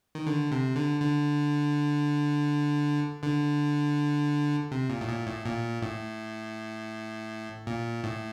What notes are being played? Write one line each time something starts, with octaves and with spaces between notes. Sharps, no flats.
D#3
D3
C3
D3
D3
D3
C3
A#2
A2
A#2
A2
A#2
A2
A#2
A2